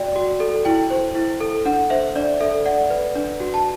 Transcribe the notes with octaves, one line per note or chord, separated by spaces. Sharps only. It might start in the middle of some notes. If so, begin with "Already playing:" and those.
Already playing: F#4 D5 G5
F#4
A4
E4 G5
C5
E4
A4
D4 F#5
C5 E5
D4 D5
A4 E5
D5 F#5
B4
D4
F#4
A5